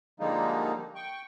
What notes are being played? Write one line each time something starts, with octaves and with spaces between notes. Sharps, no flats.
D3 F3 G3 G#3 A#3 D#4
G5 C#6